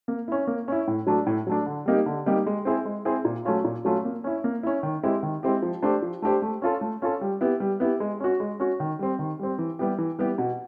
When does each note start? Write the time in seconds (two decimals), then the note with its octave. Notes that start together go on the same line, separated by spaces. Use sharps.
0.08 A#3
0.28 C#4 E4
0.47 A#3
0.68 C#4 E4
0.88 A2
1.07 F#3 A3 D4
1.27 A2
1.47 F#3 A3 D4
1.66 D3
1.86 G3 A#3 D#4 G4
2.06 D3
2.26 G3 A#3 D#4 G4
2.46 G#3
2.65 C4 E4 G#4
2.85 G#3
3.05 C4 E4 G#4
3.25 A#2
3.45 F#3 A3 C#4 F4
3.64 A#2
3.85 F#3 A3 C#4 F4
4.05 A#3
4.24 C#4 E4
4.44 A#3
4.63 C#4 E4
4.83 D#3
5.03 G#3 C4 E4 G4
5.23 D#3
5.43 G#3 C4 E4 G4
5.62 F3
5.82 A3 D4 G4 C5
6.02 F3
6.22 A3 D4 G4 C5
6.42 A3
6.62 C#4 F4 A4
6.81 A3
7.02 C#4 F4 A4
7.21 G3
7.41 B3 E4 G4
7.60 G3
7.80 B3 E4 G4
8.00 G#3
8.20 C#4 F#4
8.40 G#3
8.60 C#4 F#4
8.80 D#3
8.99 G3 C4
9.19 D#3
9.39 G3 C4
9.58 E3
9.79 G3 B3 E4 G4
9.98 E3
10.19 G3 B3 E4 G4
10.38 B2